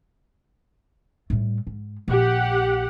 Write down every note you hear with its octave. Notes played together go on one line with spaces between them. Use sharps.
A2 G3
G#2
A#1 G4 F#5